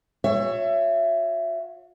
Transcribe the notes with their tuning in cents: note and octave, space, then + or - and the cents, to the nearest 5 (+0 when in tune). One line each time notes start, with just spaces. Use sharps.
F#4 -45 C#5 +0 E5 +20